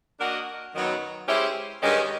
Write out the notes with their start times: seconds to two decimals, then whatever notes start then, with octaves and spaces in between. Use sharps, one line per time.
0.19 A#3 D4 F#4 A#4 D#5
0.74 F#2 D#3 F#3 B3 D#4
1.28 G#3 C#4 E4 G4 C5
1.82 G2 D#3 G#3 C#4